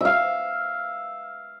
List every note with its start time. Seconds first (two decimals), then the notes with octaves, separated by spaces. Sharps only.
0.01 E5 F5